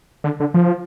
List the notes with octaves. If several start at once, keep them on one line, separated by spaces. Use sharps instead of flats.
D3
D3
F3